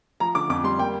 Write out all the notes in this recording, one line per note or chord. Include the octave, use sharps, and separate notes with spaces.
F3 A#5
D3 D6
F2 D6
G3 C6
A#3 G5